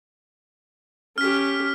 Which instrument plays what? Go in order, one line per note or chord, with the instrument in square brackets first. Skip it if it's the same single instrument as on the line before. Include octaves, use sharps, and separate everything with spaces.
[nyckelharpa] C#4 G4 [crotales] F6 B6